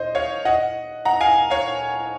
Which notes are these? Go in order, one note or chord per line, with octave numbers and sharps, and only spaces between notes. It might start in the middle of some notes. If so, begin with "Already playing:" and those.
Already playing: C5 D#5
C#5 F5
D#5 F#5
F#5 A#5
F5 G#5
C#5 F5